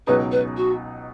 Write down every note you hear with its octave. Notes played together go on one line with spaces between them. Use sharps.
C#2 B2 F#3 D#4 G#4 B4
B4
F#4